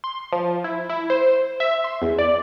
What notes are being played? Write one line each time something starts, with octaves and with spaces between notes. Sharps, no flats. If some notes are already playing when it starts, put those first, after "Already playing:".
C6
F3
E4
E4
C5
E5
C6
E2
D5